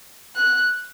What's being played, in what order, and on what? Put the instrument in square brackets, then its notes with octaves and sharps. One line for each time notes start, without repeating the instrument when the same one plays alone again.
[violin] F#6